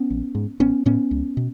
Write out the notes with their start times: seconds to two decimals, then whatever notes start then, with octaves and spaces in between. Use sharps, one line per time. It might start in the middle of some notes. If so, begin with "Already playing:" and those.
Already playing: B3 C#4
0.10 A#1
0.35 G#2
0.60 A1 B3 C#4
0.86 A2 B3 C#4
1.11 C#2
1.37 B2